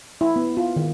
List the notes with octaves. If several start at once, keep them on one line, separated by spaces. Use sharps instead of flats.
E4
B3
F4
D#3